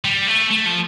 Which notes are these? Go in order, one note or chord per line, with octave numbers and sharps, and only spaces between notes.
G3
A3
A3
F3